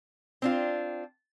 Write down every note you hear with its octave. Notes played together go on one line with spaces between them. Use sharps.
C4 D4 F4